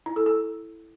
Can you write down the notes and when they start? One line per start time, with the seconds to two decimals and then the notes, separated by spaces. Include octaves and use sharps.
0.06 E4
0.16 A4
0.26 A4